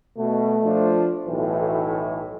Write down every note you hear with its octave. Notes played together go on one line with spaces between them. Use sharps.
B2 A3
F3 D4
B1 A2 E3